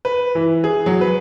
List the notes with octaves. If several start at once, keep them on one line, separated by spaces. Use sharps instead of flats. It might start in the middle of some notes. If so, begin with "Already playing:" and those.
B4
E3
G#4
F#3
B4